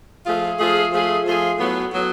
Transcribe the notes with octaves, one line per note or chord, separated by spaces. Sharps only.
F3 A3 F4 G#4
F3 A3 F4 G#4
F3 A3 F4 G#4
F3 A3 F4 G#4
A2 F#3 B3
A2 F#3 B3